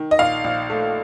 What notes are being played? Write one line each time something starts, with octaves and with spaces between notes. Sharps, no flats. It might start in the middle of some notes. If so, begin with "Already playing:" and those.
Already playing: D#3
D#5
A#1 F5
A#1
A3